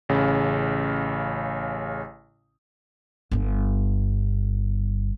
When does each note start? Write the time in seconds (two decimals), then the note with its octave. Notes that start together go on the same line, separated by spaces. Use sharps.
0.09 A1 C#3
3.31 G1 G2